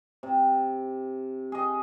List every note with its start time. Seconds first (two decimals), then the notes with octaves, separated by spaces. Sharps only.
0.23 C3
1.52 G#4 D#5